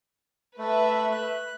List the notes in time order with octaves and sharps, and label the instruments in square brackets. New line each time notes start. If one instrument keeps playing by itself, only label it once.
[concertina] A3 [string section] B4 E5
[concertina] F#6